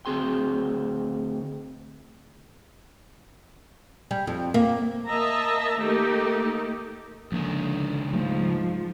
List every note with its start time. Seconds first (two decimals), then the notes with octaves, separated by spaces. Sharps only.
0.06 D2 C4 G#4 C6
4.11 G3
4.27 F2
4.54 A#3
5.07 A#3 D#5 E5 A5 A#5
5.80 D#3 A3 A#3 D#4 G4
7.32 C#2 D3 D#3 F3 A#3
8.13 G#2 F3 F#3 A3 A#3